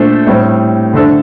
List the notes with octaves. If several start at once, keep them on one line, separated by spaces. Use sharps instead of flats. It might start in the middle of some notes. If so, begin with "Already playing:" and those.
Already playing: A#2 A3 D4 A4 C5
A2 G3 C4
D3 A3 D4 A4 C5